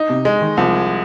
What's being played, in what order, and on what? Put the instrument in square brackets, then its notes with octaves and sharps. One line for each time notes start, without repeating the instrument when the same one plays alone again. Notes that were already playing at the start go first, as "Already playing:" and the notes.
Already playing: [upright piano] D#4
[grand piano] C3
[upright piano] G#3
[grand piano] D#3
[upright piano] C2 [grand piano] F3